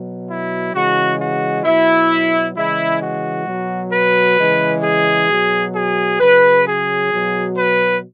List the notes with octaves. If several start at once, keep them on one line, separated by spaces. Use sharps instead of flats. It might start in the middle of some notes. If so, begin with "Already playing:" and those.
Already playing: B2 F#3
E4
C#3 E3 G#3 F#4
F#4
B2 F#3 E4
C#3 E3 G#3 E4
F#4
B2 F#3
B4
C#3 E3 G#3
G#4
B2 F#3
G#4
C#3 F#3 B4
G#4
B2 F#3
B4